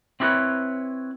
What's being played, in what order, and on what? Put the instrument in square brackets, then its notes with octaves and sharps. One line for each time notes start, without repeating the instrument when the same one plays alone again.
[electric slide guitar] C4 E4 G4 A4 B4 C#5